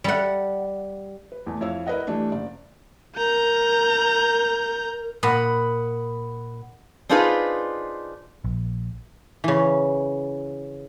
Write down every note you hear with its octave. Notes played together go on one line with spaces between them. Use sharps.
G3 F#5
B4
E2 A3
F2 E4 C#5 F5 E6
E4 A#4 B4 D5 D#5 F#5
E3 G3 A3 D4
F#1 D5
A#4 A#5 G6
A#2 F#5 B5 D#6
C4 D4 D#4 F4 G#4 B4
A#1
C#3 E3